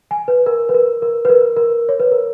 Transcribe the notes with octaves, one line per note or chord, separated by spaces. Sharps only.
G#5
B4
A#4
B4
A#4
A#4
B4
A#4
A#4
C#5
B4
A#4